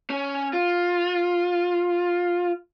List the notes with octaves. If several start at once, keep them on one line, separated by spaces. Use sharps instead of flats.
C#4
F4